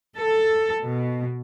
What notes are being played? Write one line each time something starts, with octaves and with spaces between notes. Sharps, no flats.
A4
B2